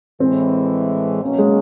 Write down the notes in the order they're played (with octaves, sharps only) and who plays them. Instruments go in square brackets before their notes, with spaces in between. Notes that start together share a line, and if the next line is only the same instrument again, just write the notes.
[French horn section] A2 E3 G#3 [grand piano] C4
[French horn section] B2 F#3 A#3 C#4
[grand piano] G#3